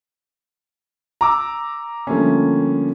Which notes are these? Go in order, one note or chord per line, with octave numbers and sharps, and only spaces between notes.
A#5 D6 E6
D3 F3 G3 A3 A#3 C#4